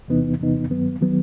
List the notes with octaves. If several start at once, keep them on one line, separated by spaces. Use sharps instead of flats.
E2 C3 E3 B3 D#4
E2 C3 E3 B3 D#4
G2 D#3 F#3 B3
D#3 F#3 B3